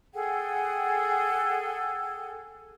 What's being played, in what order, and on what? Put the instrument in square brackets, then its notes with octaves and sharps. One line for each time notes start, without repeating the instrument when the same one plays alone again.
[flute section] G#4 A4 F#5 G5